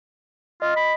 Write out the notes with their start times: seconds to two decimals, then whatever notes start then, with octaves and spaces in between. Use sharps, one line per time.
0.62 F4 D#5
0.76 B5